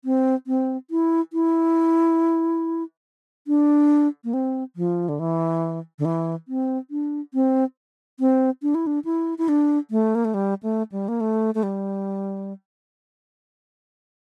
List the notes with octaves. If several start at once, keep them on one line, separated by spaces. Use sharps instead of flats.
C4
C4
E4
E4
D4
A#3
C4
F3
D3
E3
D3
E3
C4
D4
C4
C4
D4
E4
D4
E4
E4
D4
A3
A#3
A3
G3
A3
G3
A#3
A3
A3
G3